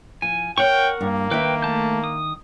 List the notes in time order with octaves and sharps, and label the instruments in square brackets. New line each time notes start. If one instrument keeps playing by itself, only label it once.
[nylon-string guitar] F3 [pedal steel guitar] G#5
[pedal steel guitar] A#4 F#5 C#6 [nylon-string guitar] C#5 [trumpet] G5
[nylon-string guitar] G2 [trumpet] A#3
[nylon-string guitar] D#3 E5 [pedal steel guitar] B4 G5
[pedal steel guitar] A3 A5 G6
D#6